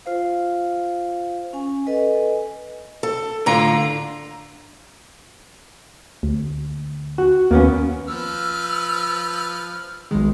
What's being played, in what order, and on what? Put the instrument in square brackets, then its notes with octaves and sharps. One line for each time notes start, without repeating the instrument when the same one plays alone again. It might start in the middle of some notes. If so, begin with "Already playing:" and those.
[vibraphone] F4 C5 F5
C#4 G#5
A4 B4 D#5 G#5
[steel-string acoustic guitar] A4
[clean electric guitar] A2 F4 [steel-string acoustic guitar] D3 A#5
[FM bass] D2
[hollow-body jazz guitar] F#4
[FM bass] D#2 [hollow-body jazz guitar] A#3 B3 C#4
[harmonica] F3 B4 F6 [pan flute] E6
[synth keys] B1 D#3 [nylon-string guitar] G#3